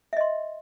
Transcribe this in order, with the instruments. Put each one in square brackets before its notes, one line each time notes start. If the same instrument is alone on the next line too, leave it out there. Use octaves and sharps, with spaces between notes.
[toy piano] E5
D#5
C6